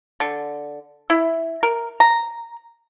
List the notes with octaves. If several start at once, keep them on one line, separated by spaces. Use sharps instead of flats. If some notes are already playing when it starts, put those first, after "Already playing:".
D3
E4
A#4
A#5